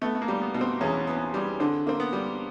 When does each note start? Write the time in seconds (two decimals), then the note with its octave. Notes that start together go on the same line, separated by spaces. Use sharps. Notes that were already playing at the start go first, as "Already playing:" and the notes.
0.01 A3 B3
0.15 A3
0.22 A#3
0.28 G3
0.41 B3
0.54 B2
0.61 C4
0.81 E2 C#4
1.07 B3
1.34 G3
1.60 D3 C4
1.87 A#3 C4
2.00 B3
2.13 G3